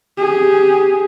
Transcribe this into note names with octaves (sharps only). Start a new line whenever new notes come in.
G4 G#4